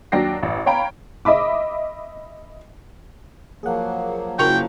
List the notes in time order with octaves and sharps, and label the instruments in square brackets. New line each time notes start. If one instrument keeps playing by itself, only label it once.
[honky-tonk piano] D#2 F#3 D4 G5 A#6 C7
A1
C#5 F5 G5 A#5 B5
D#5 E5 B5 D6
[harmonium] F3 F#3 A#3 [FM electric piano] G#4 F#5
[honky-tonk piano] F#1 C#6 F7 [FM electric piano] E4 F#4 A#4 [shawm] G5